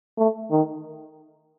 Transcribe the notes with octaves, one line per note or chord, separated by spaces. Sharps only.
A3
D#3